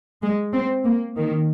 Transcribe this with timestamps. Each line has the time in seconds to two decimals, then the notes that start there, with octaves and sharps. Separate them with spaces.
0.22 G#3
0.53 C4
0.84 A#3
1.16 D#3